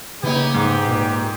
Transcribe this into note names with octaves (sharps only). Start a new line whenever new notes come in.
C#3 A#3 B3 D#4 G4 C#5
G#2
A#2